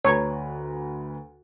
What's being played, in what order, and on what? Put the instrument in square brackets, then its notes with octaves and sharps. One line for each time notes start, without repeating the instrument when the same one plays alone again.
[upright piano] D2 B4 A#5 [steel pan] C#5